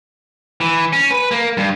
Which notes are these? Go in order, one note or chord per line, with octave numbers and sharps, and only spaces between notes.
E3
C#4
B4
A#3
G2